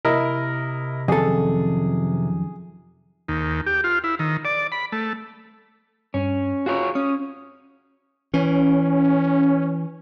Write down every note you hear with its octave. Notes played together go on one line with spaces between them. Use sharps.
C3 E4 A#4 D#5
F2 D#3 F#3 C#4 G#4 A4
D#2
G4
F4
E4
D#3
D5
B5
A3
G2 C#4
F4 F#4 G#4 C#5
C#4 D#6
E3 C#4